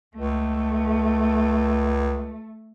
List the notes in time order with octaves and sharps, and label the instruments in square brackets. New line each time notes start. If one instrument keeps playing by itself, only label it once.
[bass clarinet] C#2 [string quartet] A3